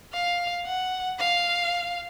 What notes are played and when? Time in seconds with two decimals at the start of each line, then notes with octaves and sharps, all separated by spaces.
0.13 F5
0.66 F#5
1.19 F5